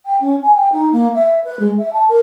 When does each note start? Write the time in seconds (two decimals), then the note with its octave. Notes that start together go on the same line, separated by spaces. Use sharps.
0.05 G5
0.21 C#4
0.42 G#5
0.54 G5
0.72 D#4
0.92 A#3
1.14 E5
1.44 B4
1.59 G#3
1.78 E5
1.93 A5
2.08 A#4